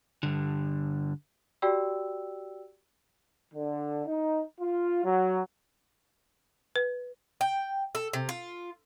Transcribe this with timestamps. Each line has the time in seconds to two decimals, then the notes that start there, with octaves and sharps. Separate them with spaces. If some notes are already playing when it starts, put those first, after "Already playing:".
0.23 G2 D3
1.62 F#4 G4 D5 G5 E6
3.54 D3
4.06 D#4
4.61 F4
5.04 F#3
6.76 B4
7.41 G5
7.95 A4
8.13 C3
8.29 F4